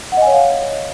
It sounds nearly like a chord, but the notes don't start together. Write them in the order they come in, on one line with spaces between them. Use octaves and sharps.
F#5 D#5 G#5 C#5 F5